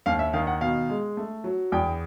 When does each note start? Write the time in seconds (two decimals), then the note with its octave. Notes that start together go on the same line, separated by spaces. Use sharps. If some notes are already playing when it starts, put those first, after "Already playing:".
0.06 D#2 F5
0.19 E5
0.33 D#3 F5
0.47 F#5
0.61 B2 F5
0.90 G#3
1.17 A3
1.44 F#3
1.72 E2 G5